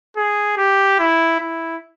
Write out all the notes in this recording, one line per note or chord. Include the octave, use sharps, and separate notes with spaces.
G#4
G4
E4
E4